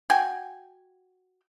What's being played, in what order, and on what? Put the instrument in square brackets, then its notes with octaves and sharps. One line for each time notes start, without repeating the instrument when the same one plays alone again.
[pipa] F#4 G5 G#5